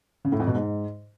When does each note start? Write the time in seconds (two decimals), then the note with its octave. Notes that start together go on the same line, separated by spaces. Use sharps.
0.25 C#3
0.32 A2
0.40 F2
0.47 B2
0.55 G#2